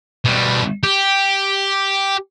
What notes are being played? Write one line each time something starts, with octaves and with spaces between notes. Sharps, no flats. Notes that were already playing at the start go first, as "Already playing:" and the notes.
B2 G3
G4